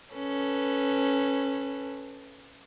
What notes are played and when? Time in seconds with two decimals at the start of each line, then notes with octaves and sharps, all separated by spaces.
0.14 C#4 A4 B4